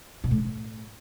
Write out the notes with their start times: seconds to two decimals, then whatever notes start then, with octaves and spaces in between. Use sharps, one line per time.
0.24 B2
0.31 A2
0.38 D3
0.45 A2